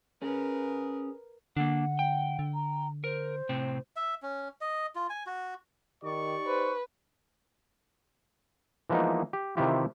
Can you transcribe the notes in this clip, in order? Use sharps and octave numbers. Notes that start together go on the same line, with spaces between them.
C#4 G#4 A#4 B4
D3 A#3 D4 F#5
G5
D3
A#5
A#4 C5
A2 C3 C4
E5
C#4
D#5
F4
G#5
F#4
D#3 D#4 G4 D5 C#6
B4 C5
E3 F3 G#3 A#3 B3 D#4
G4
C3 D#3 E3 E4 F4 G4